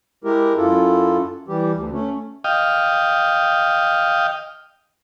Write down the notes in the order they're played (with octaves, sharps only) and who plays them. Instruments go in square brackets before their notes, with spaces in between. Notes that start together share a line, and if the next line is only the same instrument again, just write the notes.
[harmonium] G#3 E4 G4 A#4
F#2 E4 F4 A4
E3 G3 G4
D2
A3 C#4
[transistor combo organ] D#5 F5 G5